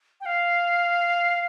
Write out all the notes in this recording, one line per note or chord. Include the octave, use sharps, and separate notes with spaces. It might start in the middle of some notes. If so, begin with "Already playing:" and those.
G5
F5